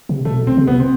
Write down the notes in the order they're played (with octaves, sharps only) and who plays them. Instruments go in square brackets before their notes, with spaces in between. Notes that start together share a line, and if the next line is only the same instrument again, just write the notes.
[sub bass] C3
[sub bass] B2 [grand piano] A3
[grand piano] C4
[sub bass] C3
[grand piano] B3
C4